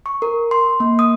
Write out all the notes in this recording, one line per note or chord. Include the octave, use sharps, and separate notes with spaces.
C#6
A#4
C6
A#3
D#6